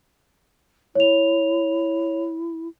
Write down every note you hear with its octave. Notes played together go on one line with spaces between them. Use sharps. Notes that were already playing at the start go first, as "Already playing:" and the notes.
E4 C#5 F7